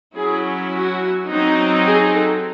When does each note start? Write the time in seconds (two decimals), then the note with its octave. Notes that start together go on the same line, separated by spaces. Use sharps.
0.15 F#3 C#4 E4 G#4
0.72 F#4
1.29 F#3 C4 D#4
1.86 G#4
2.14 A4